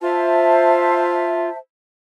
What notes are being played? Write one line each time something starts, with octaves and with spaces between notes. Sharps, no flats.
F4 C5 E5 A5